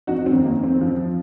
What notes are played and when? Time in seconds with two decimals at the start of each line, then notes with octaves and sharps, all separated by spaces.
0.07 F2 D#4 F#4
0.26 C4
0.32 D#3
0.45 A#3
0.57 F2
0.63 C4
0.81 F3